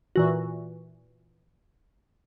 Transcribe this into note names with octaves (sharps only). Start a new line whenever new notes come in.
A#2 E3 F#4